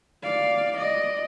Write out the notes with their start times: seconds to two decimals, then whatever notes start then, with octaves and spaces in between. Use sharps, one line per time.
0.24 D5 F5
0.78 D5 D#5